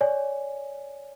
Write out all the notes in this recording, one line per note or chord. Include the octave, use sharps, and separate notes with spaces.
C#5 D5 G#5